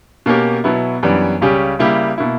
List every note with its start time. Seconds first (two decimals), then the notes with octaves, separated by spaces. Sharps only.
0.26 B2 A#3 C#4 G4 A#4
0.64 B2 F#3 B3 E4
1.03 F#2 E3 G3 B3 D4
1.41 C#2 C#3 G3 C#4 G4
1.79 C#3 G3 A#3 E4 G4
2.18 B2 A#3 E4